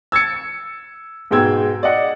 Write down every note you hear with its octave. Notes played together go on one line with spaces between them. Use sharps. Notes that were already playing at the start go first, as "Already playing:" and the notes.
E6 G#6 A6 C#7
G#2 B2 G#3 G5 E6 G#6
D5 D#5 F#5